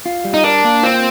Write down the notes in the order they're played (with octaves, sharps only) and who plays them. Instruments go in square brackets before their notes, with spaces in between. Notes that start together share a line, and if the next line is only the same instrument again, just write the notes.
[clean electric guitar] F4
G3
[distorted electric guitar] D#4
[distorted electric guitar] D4 [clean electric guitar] A#4
[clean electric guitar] A#3
[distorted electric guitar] C4 [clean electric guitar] F4